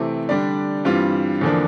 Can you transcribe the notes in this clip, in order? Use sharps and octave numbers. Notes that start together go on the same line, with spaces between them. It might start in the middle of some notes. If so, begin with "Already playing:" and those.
Already playing: C3 E3 A3 C4 G4
D3 G3 D4 G4 D5
G2 E3 G3 C4 F4
E2 D3 F3 A#3 D4